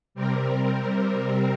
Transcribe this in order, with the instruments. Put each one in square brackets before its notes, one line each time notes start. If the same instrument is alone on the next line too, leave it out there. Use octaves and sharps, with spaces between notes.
[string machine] C3 G3 C4 A#4